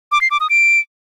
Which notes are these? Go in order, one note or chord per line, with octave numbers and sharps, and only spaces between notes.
D6
C7
D6
D#6
D7